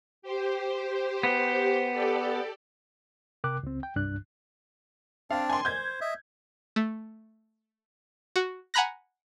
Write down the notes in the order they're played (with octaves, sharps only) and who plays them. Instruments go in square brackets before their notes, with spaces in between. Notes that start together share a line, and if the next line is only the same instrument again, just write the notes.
[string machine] G4 C5
[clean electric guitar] B3
[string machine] G4 A4 D5
[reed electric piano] C3 A#4 G5 D6 F#6
C#2 C4
G5
C2 G2 D4 F#6
[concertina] C4 D4 D5 [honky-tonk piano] F5
[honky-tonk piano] G#5 C6
[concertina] C5 [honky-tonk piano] G6 G#6
[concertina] D#5 E5
[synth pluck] A3
F#4
F#5 G#5 A#5 B5 F#6 A#6